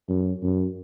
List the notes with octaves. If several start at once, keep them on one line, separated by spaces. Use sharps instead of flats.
F#2
F#2